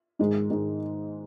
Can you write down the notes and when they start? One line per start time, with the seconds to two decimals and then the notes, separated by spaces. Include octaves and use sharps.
0.19 G#2 D#3 G#3
0.50 G#2 D#3 G#3